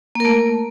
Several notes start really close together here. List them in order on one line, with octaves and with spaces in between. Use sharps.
A#3 A#4 A3